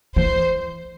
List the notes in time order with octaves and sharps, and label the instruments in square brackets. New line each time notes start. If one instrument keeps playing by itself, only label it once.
[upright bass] E3 [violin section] C5